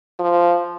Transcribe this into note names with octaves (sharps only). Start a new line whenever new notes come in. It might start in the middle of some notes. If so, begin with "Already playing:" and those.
F3